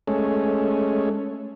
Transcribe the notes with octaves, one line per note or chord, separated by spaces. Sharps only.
G#3 A3 C#4